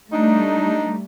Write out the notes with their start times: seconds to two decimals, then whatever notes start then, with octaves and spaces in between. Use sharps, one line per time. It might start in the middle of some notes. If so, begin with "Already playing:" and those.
0.12 G3 A3 D4 D#4